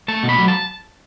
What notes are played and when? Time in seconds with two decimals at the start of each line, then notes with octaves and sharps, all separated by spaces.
0.08 A3 A5
0.23 B2
0.29 B5
0.38 F#3
0.48 A5